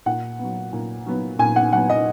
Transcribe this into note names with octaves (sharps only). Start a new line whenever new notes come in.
A#2 F#5
F#3 B3
A#2
F#3 B3
A#2 G#5
F#5
F#3 B3 F#5
D#5